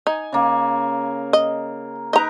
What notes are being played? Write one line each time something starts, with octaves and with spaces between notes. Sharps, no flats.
D#4 G#5
C#3 A#3
D#5
D#4 A#4 B4 D#5 A#5